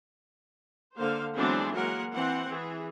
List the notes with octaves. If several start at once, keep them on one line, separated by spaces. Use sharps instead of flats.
D3 A#3 C5 F5
E3 F#3 G#3 B3 C4 D4
F#3 G#3 A#3 A#4 F#5
E3 C4 F#5
E3 G#4